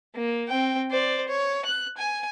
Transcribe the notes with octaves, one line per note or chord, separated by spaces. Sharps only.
A#3
C4 G5
C5 D5
C#5
F#6
G#5